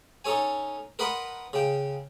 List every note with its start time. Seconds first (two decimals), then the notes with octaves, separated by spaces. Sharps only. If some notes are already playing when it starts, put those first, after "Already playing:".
0.25 C#4 D#4 A4 C#5 G#5
0.99 A#4 B4 D#5 F#5 B5 C6
1.53 C#3 G5